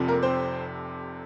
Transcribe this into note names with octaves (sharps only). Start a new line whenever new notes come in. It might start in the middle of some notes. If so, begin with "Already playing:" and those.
Already playing: F1 F2 C3 F3
A#3 A#4
C4 C5